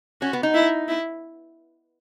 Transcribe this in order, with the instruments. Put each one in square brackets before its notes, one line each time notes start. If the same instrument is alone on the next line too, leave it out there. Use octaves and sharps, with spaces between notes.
[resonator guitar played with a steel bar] C#4 [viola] F#4
[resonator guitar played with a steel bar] B3
D#4
[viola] E4
E4